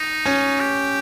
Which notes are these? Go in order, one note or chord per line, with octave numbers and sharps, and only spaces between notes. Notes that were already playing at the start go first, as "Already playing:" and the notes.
Already playing: D#4
C#4
G4